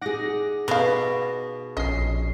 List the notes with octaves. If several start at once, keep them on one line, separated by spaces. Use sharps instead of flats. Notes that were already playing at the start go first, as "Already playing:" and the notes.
D#4 G#4 F#5 D6 A#6
B2 B4 F5
A#1 C#4 D#5 C7